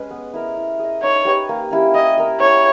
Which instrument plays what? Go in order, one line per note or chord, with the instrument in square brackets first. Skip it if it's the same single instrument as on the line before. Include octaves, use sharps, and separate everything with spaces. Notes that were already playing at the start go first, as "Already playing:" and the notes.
Already playing: [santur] G#3 C#4 G#4 B4
B3
E4 A#4
E4
G#4 D#5
[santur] D#4 [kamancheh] C#5
[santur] G4 B4 D#5
A#3
C#4 E4 G4
[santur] E4 [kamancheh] D#5
[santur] A#4 E5
[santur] E4 [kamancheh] C#5